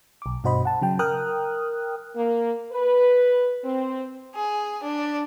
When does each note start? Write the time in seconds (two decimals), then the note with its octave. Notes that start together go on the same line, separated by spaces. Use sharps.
0.22 B1 D6
0.44 G2 B2 F#4 C5 D#5 B5
0.65 F#5 A5
0.82 C#3 F#3 G5
0.99 A#4 G5 D#6 F6 F#6
2.16 A#3
2.72 B4
3.64 C4
4.34 G#4
4.82 D4